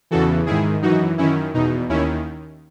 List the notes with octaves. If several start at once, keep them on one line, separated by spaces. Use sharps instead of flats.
E2 C#3 E3 F#4 A4
G#2 D#3 E4 G#4
F#2 E3 D#4 F#4
F#2 D#3 C#4 E4
E2 B2 D#4
D#2 D#3 C#4 E4